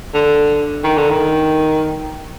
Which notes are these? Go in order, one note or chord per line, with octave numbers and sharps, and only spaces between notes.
D3
D#3
D3
D#3